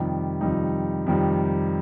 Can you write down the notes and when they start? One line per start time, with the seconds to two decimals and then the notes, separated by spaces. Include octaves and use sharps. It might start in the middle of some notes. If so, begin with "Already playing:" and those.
Already playing: F2 C3 D#3 G3 D#4
0.41 F2 C3 D#3 G3 D#4
1.06 F2 C3 D#3 G3 D#4